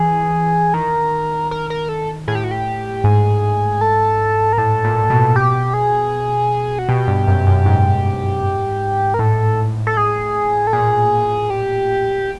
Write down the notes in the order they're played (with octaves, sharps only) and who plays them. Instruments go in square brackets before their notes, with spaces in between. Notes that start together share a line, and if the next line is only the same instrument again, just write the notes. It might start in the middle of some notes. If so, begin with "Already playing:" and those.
Already playing: [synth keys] E3 [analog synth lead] G#4
[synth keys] D#3 [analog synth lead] A#4
[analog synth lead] A#4
A#4
A4
[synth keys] A2 [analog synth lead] G#4
[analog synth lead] G4
F#4
G4
[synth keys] G#2 [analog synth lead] G#4
[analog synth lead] A4
A#4
[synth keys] A2 [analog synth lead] A4
[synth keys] A#2
B2
[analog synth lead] G4
G#4
F#4
[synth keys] B2 [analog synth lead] G4
[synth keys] G2
F#2
F#2
G#2
[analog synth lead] A#4
[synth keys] A2 [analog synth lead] A4
[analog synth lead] A4
G#4
A4
[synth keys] A#2 [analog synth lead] G#4
[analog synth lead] G4